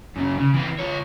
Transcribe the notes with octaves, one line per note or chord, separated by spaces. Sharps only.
F#2 C#3
C#3
E3 C4
F4 C#5